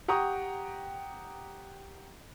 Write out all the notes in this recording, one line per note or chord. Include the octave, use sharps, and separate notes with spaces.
G4 F#5 G5 A#5 C#6 D#6